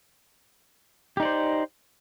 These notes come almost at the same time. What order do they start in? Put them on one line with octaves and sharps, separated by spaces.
G4 D#4 D5 C5